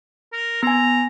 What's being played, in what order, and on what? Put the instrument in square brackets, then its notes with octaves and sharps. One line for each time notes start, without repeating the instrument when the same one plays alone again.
[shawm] A#4
[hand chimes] B3 G#5 [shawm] A#5